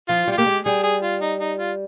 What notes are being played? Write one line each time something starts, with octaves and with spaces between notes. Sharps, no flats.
F3 F4
G3 F4
A#3 G4
G#3
G3 G#4
G#4
F4
D#4
D#4
F4